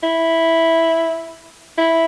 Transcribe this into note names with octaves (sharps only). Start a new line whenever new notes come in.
E4
E4